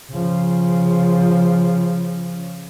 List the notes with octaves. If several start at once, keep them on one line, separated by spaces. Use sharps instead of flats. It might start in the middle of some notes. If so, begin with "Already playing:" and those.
C#3 F3